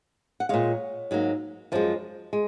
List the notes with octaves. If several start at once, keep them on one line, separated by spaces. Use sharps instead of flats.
F#5
A#2 G#3 C#5 F5
G#2 F#3 A#3
F#2 F3 G#3
G#3